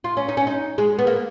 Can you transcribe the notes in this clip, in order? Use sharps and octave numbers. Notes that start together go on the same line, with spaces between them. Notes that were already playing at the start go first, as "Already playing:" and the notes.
F4
C#4
D#4
C#4
D#4
G#3
B3
A#3